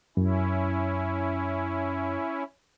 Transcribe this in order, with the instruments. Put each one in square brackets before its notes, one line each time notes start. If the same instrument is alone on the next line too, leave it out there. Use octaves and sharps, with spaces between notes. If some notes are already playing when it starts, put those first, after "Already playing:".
[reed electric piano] F#2 [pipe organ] C#4 E4